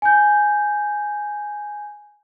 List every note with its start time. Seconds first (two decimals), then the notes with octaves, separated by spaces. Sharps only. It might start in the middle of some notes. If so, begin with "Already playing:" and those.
0.02 G#5 G6